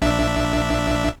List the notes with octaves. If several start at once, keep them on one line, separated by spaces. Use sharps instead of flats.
A#1 D4 E5